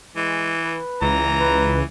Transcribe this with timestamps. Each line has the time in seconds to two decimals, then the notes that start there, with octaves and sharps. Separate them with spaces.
0.16 E3 G#3
0.64 B4
1.02 C#2 E3 A#5
1.40 B4